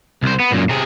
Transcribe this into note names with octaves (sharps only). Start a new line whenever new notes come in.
C2 C5
B3
F#2 A#2
C3 G#4